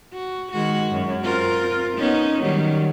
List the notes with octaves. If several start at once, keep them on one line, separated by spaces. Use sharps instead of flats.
F#4
D#3 G#3 F#4
F#2
C4 F4 A#4
B3 C#4 D#4
D#3 F#3 G3